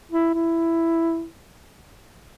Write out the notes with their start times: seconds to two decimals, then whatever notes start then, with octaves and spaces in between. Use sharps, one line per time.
0.12 E4
0.34 E4